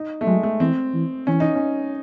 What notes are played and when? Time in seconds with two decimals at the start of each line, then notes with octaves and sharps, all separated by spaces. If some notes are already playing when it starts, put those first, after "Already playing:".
Already playing: D#4
0.21 A3
0.26 F#3 G#3
0.43 A3
0.60 E3 C4
0.94 E3
1.27 E3 C#4
1.40 D#4
1.55 C#4